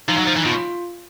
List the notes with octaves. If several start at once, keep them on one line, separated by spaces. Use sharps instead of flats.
F3 D#4
F#3
F3
E3
B2 F4